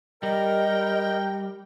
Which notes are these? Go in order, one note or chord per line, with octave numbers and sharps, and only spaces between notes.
G3 A#4 D#5 G5